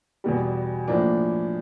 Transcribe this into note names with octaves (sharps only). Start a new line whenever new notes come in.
E2 B2 G3
A2 F3 A#3 D4